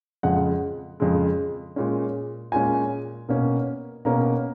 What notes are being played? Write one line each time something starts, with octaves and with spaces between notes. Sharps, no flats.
F2 C#3 G#3 F#5
F2 C#3 G#3
A#2 G#3 C#4
A#2 G#3 C#4 G#5
B2 A#3 C#4
B2 A#3 C#4 A#5